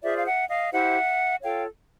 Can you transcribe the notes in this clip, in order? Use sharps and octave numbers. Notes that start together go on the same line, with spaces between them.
F4 G#4 C5 D5 E5
F5
E5 F#5
D#5 F5
E4 G4 C5 E5 F#5
F4 A4 C#5 F5 G5